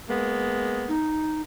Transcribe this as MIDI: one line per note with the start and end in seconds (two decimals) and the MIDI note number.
0.08 0.93 56
0.08 0.93 58
0.08 0.93 59
0.88 1.42 63